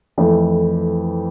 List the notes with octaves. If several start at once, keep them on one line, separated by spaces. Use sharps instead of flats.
F2 E3 A3